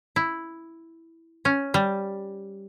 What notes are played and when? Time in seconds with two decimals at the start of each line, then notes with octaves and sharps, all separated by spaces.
0.16 E4
1.45 C#4
1.74 G3